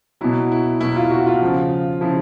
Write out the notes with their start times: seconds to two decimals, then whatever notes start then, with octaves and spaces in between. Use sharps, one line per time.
0.21 B2 F#3 E4
0.52 E4
0.81 B2 F#3 E4
0.96 F4
1.11 F#4
1.27 F4
1.41 C#3 F3
2.01 C#3 F3 E4